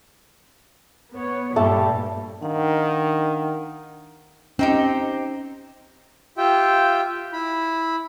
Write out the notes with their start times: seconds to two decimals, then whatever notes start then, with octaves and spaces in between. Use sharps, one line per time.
1.13 B3 C#5
1.56 G2 A#2 G3 A3 A5
2.42 D#3 D4 F5 F#5
4.59 C4 C#4 D#4 G4
6.38 F4 G4 E5 G5
7.33 E4 B5